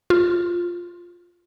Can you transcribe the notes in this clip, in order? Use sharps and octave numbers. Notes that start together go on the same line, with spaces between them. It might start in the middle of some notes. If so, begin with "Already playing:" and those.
F4